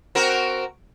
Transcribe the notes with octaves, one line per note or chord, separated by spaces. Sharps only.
C4 F#4 A#4